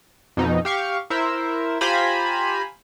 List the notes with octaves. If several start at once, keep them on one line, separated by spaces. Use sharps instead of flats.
F2 B2 D#4
G4 F5 C#6
E4 A#4 C5 E5
F4 G4 C5 G#5 A#5 B5